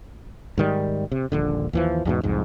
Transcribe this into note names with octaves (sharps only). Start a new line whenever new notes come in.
G#2 D#3 G3
C3
D#1 A#1 D3
D#2 E3 F3
E2 G#2 B2
C2 F2 G#2